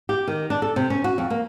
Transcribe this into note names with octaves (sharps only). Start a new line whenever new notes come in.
G4
D#3
D4
A4
C3
C#4
F#4
F2
A#3